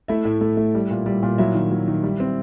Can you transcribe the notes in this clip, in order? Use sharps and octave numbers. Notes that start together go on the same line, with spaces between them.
A3 E4 E5
A2
A3
A3
G3
A#2
G3
A#2
F#3 E4 E5
D#3
F#3
D#3
G3
C4